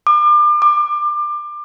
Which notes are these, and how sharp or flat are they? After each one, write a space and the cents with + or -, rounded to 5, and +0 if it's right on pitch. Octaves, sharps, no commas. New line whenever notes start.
D6 +35
D6 +25